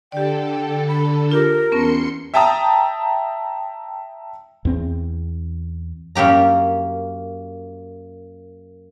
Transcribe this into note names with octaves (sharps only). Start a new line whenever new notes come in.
D3 G4 A4 D5 G5
B5
F4 G4 A#4 D6
E2 B3 C#4 A5 C6 C#7
E5 G5 A5 A#5 D#6
E2 C4
F#2 A#3 G4 A#5